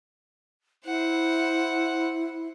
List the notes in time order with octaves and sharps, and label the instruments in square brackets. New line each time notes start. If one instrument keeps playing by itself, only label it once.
[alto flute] E4 [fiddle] C5 F#5